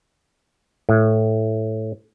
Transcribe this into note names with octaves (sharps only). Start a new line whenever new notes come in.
A2